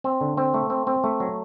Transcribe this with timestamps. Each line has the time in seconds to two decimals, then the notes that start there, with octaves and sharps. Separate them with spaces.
0.04 C4
0.21 D3
0.37 C4
0.54 A3
0.70 C4
0.87 C4
1.04 A3
1.20 F#3